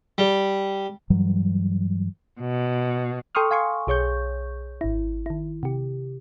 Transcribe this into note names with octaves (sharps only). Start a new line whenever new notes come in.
G3
G2 E3 F#3 G3
B2
A4 G5 C6 C#6 D#6 F6
F5 G#5 C6 C#6
B1 G#4 C#5 C#6 G6
G#1 E4
D#3 E4
C3 G4